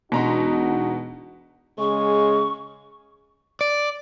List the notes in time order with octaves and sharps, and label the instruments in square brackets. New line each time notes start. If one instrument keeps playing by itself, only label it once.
[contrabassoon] E1 [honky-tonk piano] B2 A#5 C6 [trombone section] D#4 F#4
[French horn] C#3 [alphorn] G#3 [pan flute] C#6
[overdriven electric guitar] D5